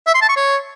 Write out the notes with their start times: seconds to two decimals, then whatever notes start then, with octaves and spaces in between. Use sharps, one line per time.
0.07 E5
0.14 C6
0.22 A5
0.29 C#6
0.36 C#5